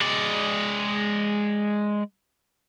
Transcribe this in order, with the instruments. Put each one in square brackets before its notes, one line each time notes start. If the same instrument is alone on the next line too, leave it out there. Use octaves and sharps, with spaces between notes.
[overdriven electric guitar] G#3 D5